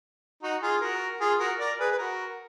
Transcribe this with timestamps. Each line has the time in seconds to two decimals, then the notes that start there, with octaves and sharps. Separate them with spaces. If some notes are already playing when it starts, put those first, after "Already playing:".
0.43 D#4 F#4
0.62 F4 G#4
0.81 F#4 A#4
1.20 F4 G#4
1.40 F#4 A#4
1.60 A#4 D5
1.79 G#4 B4
1.92 B4
1.98 F#4 A#4